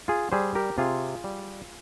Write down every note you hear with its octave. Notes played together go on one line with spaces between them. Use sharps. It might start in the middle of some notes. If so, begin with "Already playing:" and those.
F4 G#4
G3 G#4 C5
G4 A#4
C3 F4 G#4
G3